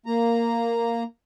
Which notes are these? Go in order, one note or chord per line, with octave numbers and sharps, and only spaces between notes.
A#3 A#5